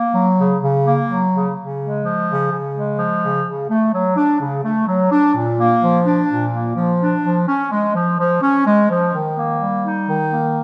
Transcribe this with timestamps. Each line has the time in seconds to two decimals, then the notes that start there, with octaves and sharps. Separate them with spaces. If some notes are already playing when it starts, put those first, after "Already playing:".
Already playing: A#3
0.15 F#3
0.38 C#3
0.62 C#3
0.85 A#3
1.09 F#3
1.32 C#3
1.57 C#3
1.80 G#3
2.03 F3
2.28 C#3
2.51 C#3
2.76 G#3
2.98 F3
3.22 C#3
3.46 C#3
3.70 A3
3.93 F#3
4.17 D4
4.41 C#3
4.64 A3
4.87 F#3
5.12 D4
5.35 A#2
5.59 A#3
5.83 F3
6.06 D4
6.30 A#2
6.53 A#3
6.76 F3
7.01 D4
7.24 F3
7.48 C#4
7.72 G#3
7.95 F3
8.19 F3
8.42 C#4
8.67 G#3
8.90 F3
9.14 D#3
9.37 A#3
9.61 G3
9.84 D#4
10.08 D#3
10.32 A#3